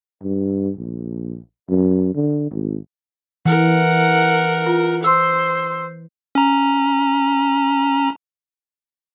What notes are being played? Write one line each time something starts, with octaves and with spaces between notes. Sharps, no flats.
G2
A#1
F#2
D3
G#1
E3 A#4 F#5
F4
C5 C6 E6
C#4 A#5